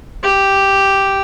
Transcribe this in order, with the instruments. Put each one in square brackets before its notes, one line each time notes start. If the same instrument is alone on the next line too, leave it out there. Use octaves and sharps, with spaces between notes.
[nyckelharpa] G4